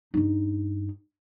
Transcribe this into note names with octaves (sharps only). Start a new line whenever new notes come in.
G2 D#4